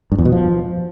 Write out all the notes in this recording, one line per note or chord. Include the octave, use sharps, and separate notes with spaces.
G2
E2
B2
F3